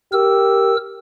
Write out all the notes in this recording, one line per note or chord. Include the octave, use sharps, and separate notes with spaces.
G4 A#4 E6